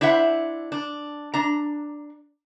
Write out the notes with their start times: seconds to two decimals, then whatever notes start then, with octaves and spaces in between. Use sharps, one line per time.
0.01 D4 E4 C5 E5 F#5
0.72 D4
1.34 D4 A#5